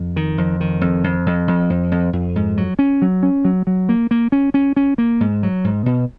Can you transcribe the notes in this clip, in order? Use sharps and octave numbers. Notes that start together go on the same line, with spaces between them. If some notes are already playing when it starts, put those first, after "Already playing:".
Already playing: F2
D#3
F2
D#3
F2
F2
F2
F2
F2
F2
F2
G#2
F#3
C#4
F#3
C#4
F#3
F#3
A#3
A#3
C#4
C#4
C#4
A#3
G#2
F#3
G#2
B2